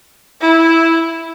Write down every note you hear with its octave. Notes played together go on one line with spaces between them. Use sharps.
E4